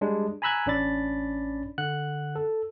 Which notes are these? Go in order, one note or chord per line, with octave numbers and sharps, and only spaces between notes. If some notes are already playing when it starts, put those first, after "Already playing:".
G3 G#3 D4
G#5 A#5 B5 E6 F#6 G#6
A1 C#4 D4 D5 B5 A6
D3 F#5 F#6
A4